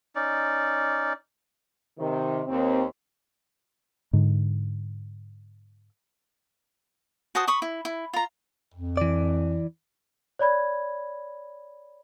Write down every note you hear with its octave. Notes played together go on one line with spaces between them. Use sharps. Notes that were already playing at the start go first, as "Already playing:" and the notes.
C#4 D#4 D5
C3 D#3
D#2 C4
G#2 D3
F#4 C5 A5 D#6
B5 C#6 D#6
E4
E4
F4 A#5
F2
E3 D5
C#5 D5 B5 G#6